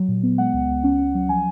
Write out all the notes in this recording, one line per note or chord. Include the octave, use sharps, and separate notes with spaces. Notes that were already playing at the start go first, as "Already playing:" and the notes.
Already playing: F#3
A#2
B3
G#3 F#5
C#2
C#2
C#4
C#4
F#3
F3 G#5